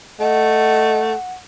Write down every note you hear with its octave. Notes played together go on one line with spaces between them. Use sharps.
A3 D#5 F#5